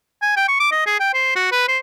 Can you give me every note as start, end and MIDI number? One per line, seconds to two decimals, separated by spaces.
0.22 0.33 80
0.36 0.47 79
0.48 0.58 85
0.60 0.69 86
0.72 0.85 75
0.86 0.97 68
1.00 1.14 79
1.14 1.31 72
1.36 1.50 66
1.51 1.65 71
1.68 1.78 72